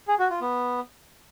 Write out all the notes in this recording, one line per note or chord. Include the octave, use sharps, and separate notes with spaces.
G#4
F#4
F4
B3